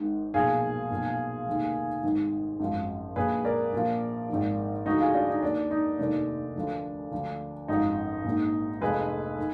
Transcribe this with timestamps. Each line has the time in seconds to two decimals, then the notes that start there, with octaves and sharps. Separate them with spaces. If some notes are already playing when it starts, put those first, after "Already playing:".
Already playing: G#1 G#2 D#3
0.34 B1 A#2 F3 F4 G#4
0.91 B1 A#2 F3
1.47 F1 D#2 D#3
2.03 G#1 G#2 D#3
2.60 G#1 F#2 F3
3.16 A#1 A#2 F3 G#4 B4
3.44 A#4 D5
3.73 A#1 A#2 F3
4.29 G#1 G#2 F3
4.86 D2 D3 F3 D#4 F#4
5.00 F4 G#4
5.14 D4 F4
5.28 D#4
5.42 D#2 D#3 D4
5.71 D#4
5.99 F1 D#2 D#3 D4
6.56 D2 D3 F3
7.12 D2 D3 F3
7.68 G#1 F#2 F3 D#4
8.25 A#1 G#2 D#3
8.81 F1 F2 F3 G#4 B4
9.38 D#3